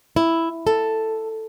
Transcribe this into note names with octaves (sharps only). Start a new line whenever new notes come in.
E4
A4